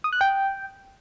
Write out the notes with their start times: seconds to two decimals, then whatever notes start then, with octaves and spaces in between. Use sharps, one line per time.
0.04 D#6
0.12 F#6
0.21 G5